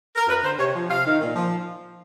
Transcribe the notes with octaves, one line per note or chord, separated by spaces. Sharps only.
A#4
F#2 B4
D3 C5
C3 C#5
F3
C3 F5
D#3
A#2
F3